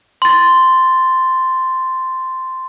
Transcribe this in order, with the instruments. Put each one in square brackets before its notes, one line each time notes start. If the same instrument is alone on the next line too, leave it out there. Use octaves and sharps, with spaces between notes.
[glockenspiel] C6 A6